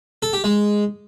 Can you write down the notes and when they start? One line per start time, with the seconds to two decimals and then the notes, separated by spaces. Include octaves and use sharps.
0.22 A4
0.33 G4
0.44 G#3